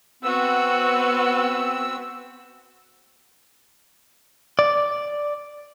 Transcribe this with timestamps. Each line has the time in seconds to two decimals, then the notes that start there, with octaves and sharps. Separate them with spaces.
0.23 B3 C4 F#4 E6
4.59 D5